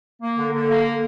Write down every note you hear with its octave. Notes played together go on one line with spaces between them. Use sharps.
A#3
D3
D3
A#3